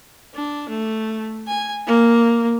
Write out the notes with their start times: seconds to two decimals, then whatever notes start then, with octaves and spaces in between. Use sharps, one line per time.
0.34 D4
0.69 A3
1.47 G#5
1.87 A#3